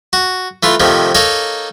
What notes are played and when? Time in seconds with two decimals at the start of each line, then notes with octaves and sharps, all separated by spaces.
0.13 F#4
0.63 E3 A3 F4
0.80 C3 D#3 F3 A3
1.15 A#3 D#4 A4 C#5